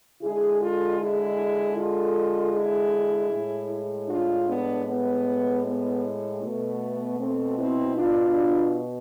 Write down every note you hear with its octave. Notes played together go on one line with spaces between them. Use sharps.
D3 G#3 E4 G#4
F4 A4
E4 G#4
F4 A4
E4 G#4
A2 G#3
D4 F4
B3 D4
B3
B3
B2 A3 B3
A3 C4
C4 E4
D4 F4